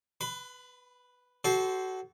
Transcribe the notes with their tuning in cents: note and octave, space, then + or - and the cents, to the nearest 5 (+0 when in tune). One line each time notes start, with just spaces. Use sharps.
B4 +0 B5 +40
F#4 +25 A4 -25 C5 +5